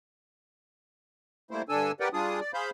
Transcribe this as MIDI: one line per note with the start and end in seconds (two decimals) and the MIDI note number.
1.51 1.62 55
1.51 1.62 57
1.51 1.62 58
1.51 1.62 64
1.51 1.62 72
1.69 1.92 43
1.69 1.92 50
1.69 1.92 62
1.69 1.92 69
1.69 1.92 80
1.69 1.92 88
2.00 2.09 67
2.00 2.09 70
2.00 2.09 71
2.00 2.09 74
2.00 2.09 78
2.00 2.09 79
2.13 2.40 55
2.13 2.40 62
2.13 2.40 65
2.13 2.40 68
2.13 2.40 87
2.40 2.52 74
2.54 2.70 68
2.54 2.70 72
2.54 2.70 77
2.54 2.70 83
2.54 2.70 91